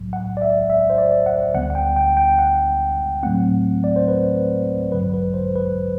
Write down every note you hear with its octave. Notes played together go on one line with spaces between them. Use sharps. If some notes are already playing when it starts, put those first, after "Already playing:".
Already playing: B1 A2 F#3
F#5
D5
E5
E5
C5
D5
F#5
D2 D3 G3 B3 F#5
F#5
G5
G5
G5
F#5
A2 F#3 A3 C4 F#5
D5
C5
B4
A1 G2 D3 F#3 B4
B4
C5
B4